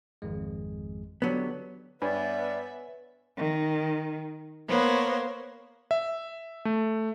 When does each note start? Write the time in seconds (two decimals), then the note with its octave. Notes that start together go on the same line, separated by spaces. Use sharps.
0.22 G#1 F2 G#3
1.22 D3 F#3 B3 D4 G4
2.02 G2 B3 B4 C#5 D5 E5 G#5
3.36 D#3
4.68 A#3 B3 C5 C#5
5.91 E5
6.65 A3